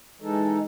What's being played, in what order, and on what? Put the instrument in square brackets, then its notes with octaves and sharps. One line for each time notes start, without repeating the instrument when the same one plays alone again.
[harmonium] E3 G#3 D#4 A4